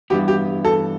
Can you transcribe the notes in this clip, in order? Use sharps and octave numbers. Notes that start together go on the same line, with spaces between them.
G2 E3 B3 G4
G4
A4